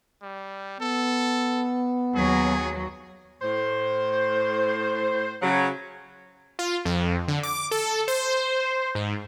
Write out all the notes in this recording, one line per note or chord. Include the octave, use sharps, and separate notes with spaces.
G3
B3 A4
D#2 F#3 G#4
A2 C5
C#3 F#3
F4
F2
D3
D6
A4
C5
G#2